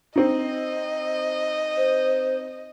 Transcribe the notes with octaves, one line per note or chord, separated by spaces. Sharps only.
C4 D#4 D#5
C5